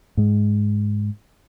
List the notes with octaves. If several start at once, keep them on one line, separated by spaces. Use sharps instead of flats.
G#2 G#3